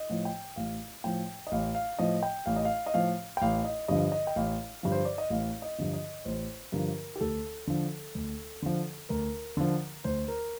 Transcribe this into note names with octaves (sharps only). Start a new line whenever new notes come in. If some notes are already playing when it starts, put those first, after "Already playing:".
Already playing: D#5
A2 F3
G5
A1 F5
A2 F3 G5
D#5
A1 F5
F5
A2 F3 D#5
G5
A1 F5
D#5
F5
D#5
A2 F3 F5
G5
A1 F5
D#5
G2 D3 F3 D#5
D#5
G5
A1 F5
G2 D3 F3
C5
D5
D#5
A1 F5
D#5
G2 D3 F3
D#5
A1 C5
G2 D3 F3 A#4
G4
D2 A4
D3 F3
D2
D3 F3
D2 A#4
D3 F3
D2 C5
A#4